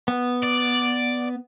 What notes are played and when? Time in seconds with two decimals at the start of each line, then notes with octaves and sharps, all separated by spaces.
0.08 B3
0.43 D5